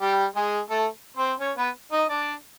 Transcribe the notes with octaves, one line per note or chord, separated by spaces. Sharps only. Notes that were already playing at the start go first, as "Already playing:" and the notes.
G3 G4
G#3 G#4
A3 A4
C4 C5
C#4 C#5
B3 B4
D#4 D#5
D4 D5